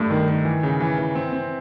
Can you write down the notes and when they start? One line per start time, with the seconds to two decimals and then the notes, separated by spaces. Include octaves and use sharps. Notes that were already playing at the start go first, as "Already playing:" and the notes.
Already playing: G2 A3
0.10 D#3
0.28 D#3
0.45 E3
0.63 C#3
0.80 E3
0.99 E3
1.15 C4
1.33 C4